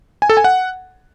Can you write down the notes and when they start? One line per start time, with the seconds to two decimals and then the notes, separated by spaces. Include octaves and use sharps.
0.22 G#5
0.30 A4
0.37 G#5
0.44 F#5